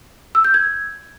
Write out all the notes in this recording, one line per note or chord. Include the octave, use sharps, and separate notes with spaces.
E6
G6
G#6